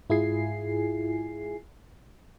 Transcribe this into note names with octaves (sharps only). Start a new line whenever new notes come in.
G#2 E4 F4 G#4 G#5 C7